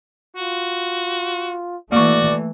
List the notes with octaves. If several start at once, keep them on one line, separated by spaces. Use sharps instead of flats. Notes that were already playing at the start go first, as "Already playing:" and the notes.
F4 F#4
E3 A3 A#3 F#4 D5 C#6